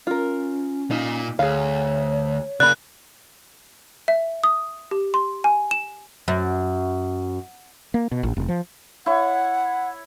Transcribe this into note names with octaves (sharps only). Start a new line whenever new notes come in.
C#4 F4 A#4
A#2 D#4
D2 G#4 C#5 F5
C#3 A#3 D5 B5 F#6
E5
D#6
G4
C6
G#5
E7
F#2
A#3
B2
A1
F1
F3
E4 C#5 F#5